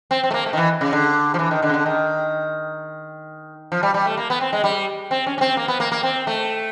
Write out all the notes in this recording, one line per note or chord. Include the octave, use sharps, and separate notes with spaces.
C4
C4
A3
A#3
A3
D#3
E3
C#3
D3
F3
E3
D#3
D3
C#3
D3
D#3
F3
G3
G3
A3
A#3
B3
C4
G#3
G3
C4
C#4
C#4
C4
A#3
B3
A#3
A#3
C4
A3